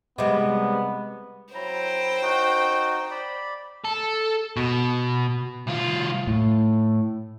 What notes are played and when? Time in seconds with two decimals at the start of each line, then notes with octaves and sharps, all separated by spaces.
0.18 C3 G3 G#3 B3 D#5 E5 D6
1.54 F#3 E4 C5 G5 A#5
2.22 D#4 F#4
3.11 D5 B5
3.85 A4
4.57 B2
5.67 C2 F4
6.27 A2